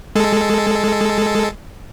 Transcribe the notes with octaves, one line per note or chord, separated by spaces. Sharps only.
G#3 A4